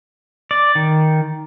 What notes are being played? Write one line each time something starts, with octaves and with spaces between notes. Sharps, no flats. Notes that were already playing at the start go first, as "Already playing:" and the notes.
D5
D#3